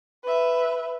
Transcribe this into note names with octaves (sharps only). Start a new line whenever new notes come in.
B4 E5